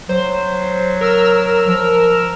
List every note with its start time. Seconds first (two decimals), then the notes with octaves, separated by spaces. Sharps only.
0.09 F#3 C5
1.01 A#4 E6 F6
1.67 F3